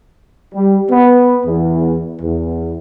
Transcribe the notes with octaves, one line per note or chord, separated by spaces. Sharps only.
G3
B3
E2
E2